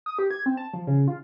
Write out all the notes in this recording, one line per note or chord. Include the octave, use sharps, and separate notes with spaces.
D#6
G4
G#6
C4
A5
F3
C#3
F4